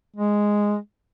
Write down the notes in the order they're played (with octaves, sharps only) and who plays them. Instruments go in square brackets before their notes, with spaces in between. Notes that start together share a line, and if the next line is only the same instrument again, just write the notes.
[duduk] G#3